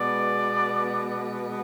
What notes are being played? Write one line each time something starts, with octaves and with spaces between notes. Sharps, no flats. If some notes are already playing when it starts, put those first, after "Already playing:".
Already playing: B2 G#3 B3 D5